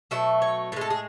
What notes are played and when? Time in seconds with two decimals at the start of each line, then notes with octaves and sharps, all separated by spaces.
0.11 B2 F#3 A3 E5
0.42 C#5
0.72 A2 B4
0.76 G#3 A4
0.90 G#4